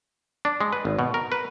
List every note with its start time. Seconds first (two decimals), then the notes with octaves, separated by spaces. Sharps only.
0.45 D4
0.61 G#3
0.73 B4
0.85 G#1
0.99 B2
1.14 A#4
1.32 B4